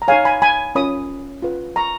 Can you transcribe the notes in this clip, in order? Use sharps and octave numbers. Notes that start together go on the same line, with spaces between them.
A#5
D#4 G#4 C#5 F5 G#5
G#5 B5
G#5 B5
C#4 F4 A#4 C#5 B5 D#6
F4 G#4 B4
A#5 C#6